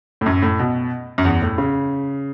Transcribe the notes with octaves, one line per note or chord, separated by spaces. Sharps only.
A2
F#2
A2
B2
F#2
E2
A2
C#3